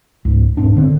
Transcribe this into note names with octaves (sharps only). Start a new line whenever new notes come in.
C#2 G#2
E1 G#2 C4 D4
D3 D#3 C4